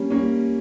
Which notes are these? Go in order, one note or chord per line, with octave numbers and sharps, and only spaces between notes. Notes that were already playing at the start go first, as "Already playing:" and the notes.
Already playing: G3 A#3 C#4
G3 A#3 C#4